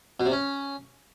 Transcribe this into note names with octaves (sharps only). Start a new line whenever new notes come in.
B2
C3
C#4